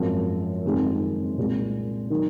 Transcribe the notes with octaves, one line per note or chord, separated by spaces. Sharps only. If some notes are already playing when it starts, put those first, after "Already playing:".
Already playing: G#1 F#2 F3 G#3
F#1 F2 D#3 G#3 C4
C2 A#2 G#3
D#3 F#3